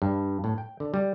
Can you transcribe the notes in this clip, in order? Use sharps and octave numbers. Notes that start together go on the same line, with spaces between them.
G2
A2
G5
D3
G3